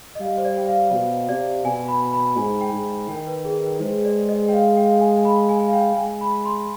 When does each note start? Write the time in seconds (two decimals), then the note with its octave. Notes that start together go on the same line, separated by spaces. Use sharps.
0.15 D#5
0.20 G3 F5
0.37 C5
0.45 D5
0.57 G5
0.68 F5
0.93 B2
1.29 C3 D5
1.65 B2 G#5
1.88 B5
2.13 B5
2.25 B5
2.37 G#2 G#5
2.61 G5
2.73 G#2
3.09 D#3 G5
3.27 B4
3.45 G#4
3.63 B4
3.81 G#3 C5
4.05 D5
4.29 D#5
4.48 G5
4.53 F5
4.77 G5
4.85 F5
4.92 G5
5.01 G#5
5.16 G#5
5.25 B5
5.49 G#5
5.68 F5
5.73 G5
5.96 G#3 G#5
6.21 B5
6.45 C6